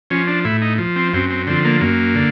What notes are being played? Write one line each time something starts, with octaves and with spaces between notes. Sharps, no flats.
F3 C#4
D4
A2 E4
D#4
F3
C4
F#2 C4
C4
D3 F3 C4
A#3
F#2 A#3
D3